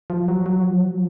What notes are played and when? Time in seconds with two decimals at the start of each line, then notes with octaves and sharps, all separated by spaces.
0.10 F3
0.28 F#3
0.46 F#3
0.63 F3
0.77 F#3
0.89 F3